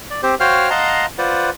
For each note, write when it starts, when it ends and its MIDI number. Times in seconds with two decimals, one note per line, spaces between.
0.10 0.21 74
0.23 0.35 60
0.23 0.35 67
0.23 0.35 72
0.40 0.70 66
0.40 0.70 72
0.40 0.70 73
0.40 0.70 77
0.40 0.70 79
0.40 0.70 89
0.70 1.06 75
0.70 1.06 77
0.70 1.06 78
0.70 1.06 81
0.70 1.06 82
0.70 1.06 84
1.18 1.50 65
1.18 1.50 71
1.18 1.50 72
1.18 1.50 74
1.18 1.50 78